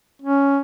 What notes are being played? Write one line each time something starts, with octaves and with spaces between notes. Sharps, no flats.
C#4